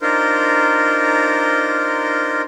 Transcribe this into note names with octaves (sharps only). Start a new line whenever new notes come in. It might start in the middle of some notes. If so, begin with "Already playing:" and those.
D4 D#4 F4 A#4 C5